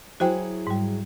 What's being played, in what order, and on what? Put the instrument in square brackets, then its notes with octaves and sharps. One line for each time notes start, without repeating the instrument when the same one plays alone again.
[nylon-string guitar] F#3 E4 G#4 [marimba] F#4 C5 G5
[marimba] G#2 G3